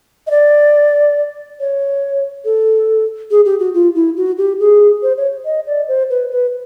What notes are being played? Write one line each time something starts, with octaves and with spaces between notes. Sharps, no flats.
D#5
D5
C#5
A4
G#4
G4
F#4
F4
E4
F#4
G4
G#4
C5
C#5
D#5
D5
C5
B4
B4